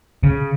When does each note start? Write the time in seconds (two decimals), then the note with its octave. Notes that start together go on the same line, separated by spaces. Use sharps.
0.23 C#3